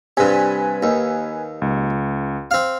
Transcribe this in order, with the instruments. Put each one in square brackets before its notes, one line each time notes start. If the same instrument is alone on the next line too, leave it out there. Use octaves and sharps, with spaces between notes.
[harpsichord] G2 C3 [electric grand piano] B4 G#5
[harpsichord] D#2
[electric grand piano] C#2
[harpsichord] C4 F5